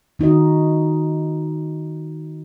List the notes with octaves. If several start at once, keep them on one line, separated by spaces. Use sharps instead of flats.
D#3 D#4 F#4 D#5